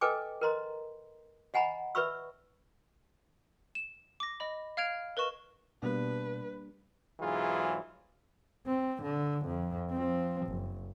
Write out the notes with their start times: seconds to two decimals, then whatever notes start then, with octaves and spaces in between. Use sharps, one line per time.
0.01 A4 B4 D#5 G5 G#5 D6
0.41 A#4 B4 D#5 A#5 C6
1.54 D#5 F#5 G#5 A#5 B5
1.95 B4 D5 E5 B5 C#6 E6
3.75 E7
4.20 D6 A#6
4.40 D#5 B5
4.77 F5 F6 G#6 D7 F7
5.17 A#4 B4 D#5 C#6 E7
5.83 B2 G3 A#3 D4 B4
7.20 B1 G#2 E3 F#3 F4 G#4
8.67 C4
9.03 D3
9.46 F2
9.90 F3 C4
10.47 F#1